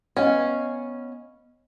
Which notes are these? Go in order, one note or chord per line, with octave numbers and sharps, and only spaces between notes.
B3 C#4 D#5 F5